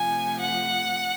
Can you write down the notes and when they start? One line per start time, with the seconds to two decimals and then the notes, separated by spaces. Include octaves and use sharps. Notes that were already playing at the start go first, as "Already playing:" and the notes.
Already playing: C3 F3 A3 G#5
0.39 F#5